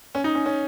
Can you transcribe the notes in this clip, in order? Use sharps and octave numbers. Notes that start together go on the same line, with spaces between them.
C#4
D#4
C#4
C#4